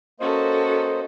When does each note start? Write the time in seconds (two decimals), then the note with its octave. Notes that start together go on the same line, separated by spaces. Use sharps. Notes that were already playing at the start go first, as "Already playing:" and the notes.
0.20 A#3 C#4 F#4 A4 C5 D#5